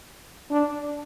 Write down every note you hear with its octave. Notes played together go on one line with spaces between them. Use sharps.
D4